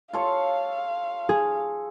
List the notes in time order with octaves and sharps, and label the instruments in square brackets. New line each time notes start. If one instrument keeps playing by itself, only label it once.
[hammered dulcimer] F4 A4 C#5 [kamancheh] F5
[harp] G#4